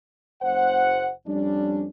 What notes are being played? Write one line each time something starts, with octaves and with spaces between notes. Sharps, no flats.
F#1 C5 F#5
F2 G3 C#4 D4